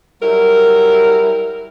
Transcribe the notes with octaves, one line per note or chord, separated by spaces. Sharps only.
F#3 G3 E4 A#4